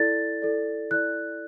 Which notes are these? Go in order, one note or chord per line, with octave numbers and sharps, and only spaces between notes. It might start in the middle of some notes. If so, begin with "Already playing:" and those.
Already playing: E4 A4 D5 A6
E4 A4 D5
E4 A4 D5 F#6